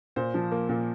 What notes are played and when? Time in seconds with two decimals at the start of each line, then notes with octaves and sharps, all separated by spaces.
0.16 A#2 C5
0.34 F3
0.52 A#3
0.69 A#2